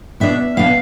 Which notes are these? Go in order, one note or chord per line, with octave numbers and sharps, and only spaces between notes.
B2 B3 D4 E5
B2 B3 D4 F5